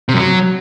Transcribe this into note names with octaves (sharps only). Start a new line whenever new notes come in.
C3
F#2
F#3